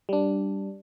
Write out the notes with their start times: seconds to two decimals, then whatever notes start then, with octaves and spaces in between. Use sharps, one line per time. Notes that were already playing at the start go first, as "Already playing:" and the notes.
0.09 G3 D4